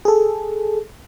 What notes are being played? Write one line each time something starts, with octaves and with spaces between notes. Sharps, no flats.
G#4 A4